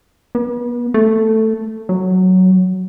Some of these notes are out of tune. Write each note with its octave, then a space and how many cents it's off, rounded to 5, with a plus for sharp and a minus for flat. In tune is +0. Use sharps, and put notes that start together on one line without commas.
B3 -35
A3 +5
F#3 +5